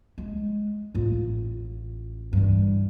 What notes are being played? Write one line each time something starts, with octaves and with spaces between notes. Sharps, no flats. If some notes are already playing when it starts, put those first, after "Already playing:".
G#3
A1 F4
G2 E3